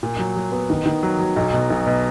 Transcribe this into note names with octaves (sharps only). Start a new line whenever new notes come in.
A#2
F#3
F#3
B3
D#3
D#3
F#3
F#3
B1
B2
B1
B2